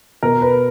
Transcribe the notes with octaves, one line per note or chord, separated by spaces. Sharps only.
B2 A#4
B4